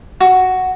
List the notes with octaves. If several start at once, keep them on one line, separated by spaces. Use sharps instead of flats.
F#4